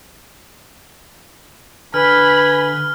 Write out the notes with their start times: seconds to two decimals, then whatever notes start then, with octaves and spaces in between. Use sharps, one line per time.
1.94 D3 B4 G#5 B5 F6